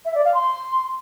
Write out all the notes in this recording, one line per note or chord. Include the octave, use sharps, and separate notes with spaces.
E5
D5
F5
C6